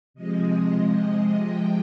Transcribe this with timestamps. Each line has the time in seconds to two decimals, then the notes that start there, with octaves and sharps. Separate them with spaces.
0.14 C3 F3 G#3 D#5
1.46 C3 F3 G#3 G5